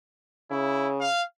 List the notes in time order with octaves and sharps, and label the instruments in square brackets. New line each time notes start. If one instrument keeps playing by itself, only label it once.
[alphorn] C#3 [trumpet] E4
[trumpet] F5